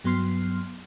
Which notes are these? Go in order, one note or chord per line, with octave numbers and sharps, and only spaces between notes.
G2 F#3 B3 C6 F6 C7